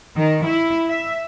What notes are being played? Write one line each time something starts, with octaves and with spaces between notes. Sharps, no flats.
D#3
E4
E5